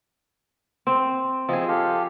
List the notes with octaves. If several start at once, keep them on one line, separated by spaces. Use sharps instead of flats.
C4
F3 C4 G#4 D#5 E6
G4 A4 F5